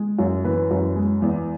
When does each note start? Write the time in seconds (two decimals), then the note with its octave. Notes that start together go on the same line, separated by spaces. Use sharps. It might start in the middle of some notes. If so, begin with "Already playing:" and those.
Already playing: G#3
0.19 F#2
0.44 E3 B4
0.71 F#2
0.96 G#3
1.22 E2